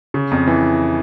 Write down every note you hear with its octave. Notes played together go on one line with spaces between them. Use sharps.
C#3
F2
E3